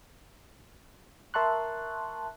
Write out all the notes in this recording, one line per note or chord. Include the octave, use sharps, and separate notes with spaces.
A#4 E5 A5 C6 C#6 F#6